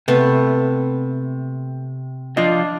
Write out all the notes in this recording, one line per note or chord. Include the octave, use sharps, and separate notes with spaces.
C3 A3 B3 A4
F3 D4 F4 D#5